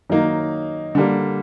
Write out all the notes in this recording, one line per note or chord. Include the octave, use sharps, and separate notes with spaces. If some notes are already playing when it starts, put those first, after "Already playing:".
D#3 F#3 A#3 D#4
D3 G3 A#3